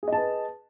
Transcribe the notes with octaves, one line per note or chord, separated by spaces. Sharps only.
G#4 B4 D#5 A5